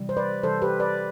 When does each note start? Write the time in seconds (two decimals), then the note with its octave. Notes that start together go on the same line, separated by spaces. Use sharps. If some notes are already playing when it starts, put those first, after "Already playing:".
Already playing: C3 E3 G3
0.09 C5
0.17 B4 D5
0.43 C3 E3 G3 A4 C5
0.62 G4 B4
0.80 B4 D5